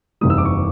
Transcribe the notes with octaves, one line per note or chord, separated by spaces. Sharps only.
F#1 E2 C3 D#3 G3 D#6
E6
D6
C#6